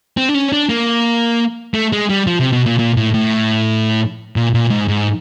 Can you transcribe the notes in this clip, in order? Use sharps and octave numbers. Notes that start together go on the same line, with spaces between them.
C4
D4
C#4
D4
A#3
A3
G#3
G3
F3
C3
B2
A#2
A#2
A2
A2
A#2
A#2
G#2
G#2